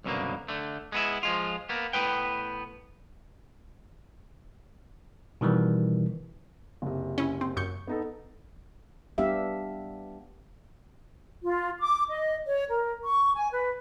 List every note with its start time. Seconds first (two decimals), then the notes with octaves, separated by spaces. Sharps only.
0.04 C2 F#2 B2 D3 A#3
0.48 D3 A3
0.92 G#3 B3 E4
1.23 F3 G#3 F4
1.69 A#3 B3
1.93 A2 B3 B4 G5
5.41 B2 D#3 E3 G3
6.82 F#1 C3
7.18 C#4 E4
7.41 C4
7.57 F#2 C#6 G6
7.87 B3 D#4 A4
9.18 G3 B3 D4 G4 E5 F5
11.43 F4
11.79 D6
12.09 D#5
12.46 C#5
12.68 A#4
13.04 C#6
13.35 G#5
13.52 B4